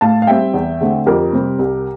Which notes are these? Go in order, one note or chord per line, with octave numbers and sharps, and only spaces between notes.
A2 F5 A5
F5
G3 C4 E5 G5
E2
D3 A3 C4
F2 G4 A#4
C3 G3 C4
C2